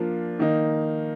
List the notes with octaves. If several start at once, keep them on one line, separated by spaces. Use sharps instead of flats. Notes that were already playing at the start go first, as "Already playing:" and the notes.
Already playing: F3 A#3 D4 F4
D#3 A#3 D#4